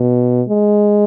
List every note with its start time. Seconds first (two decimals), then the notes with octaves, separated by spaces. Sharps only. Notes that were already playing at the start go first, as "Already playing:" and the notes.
Already playing: B2
0.49 G#3